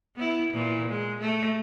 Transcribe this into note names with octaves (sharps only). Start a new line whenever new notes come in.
B3 E4
A#2 E3
G#3
A3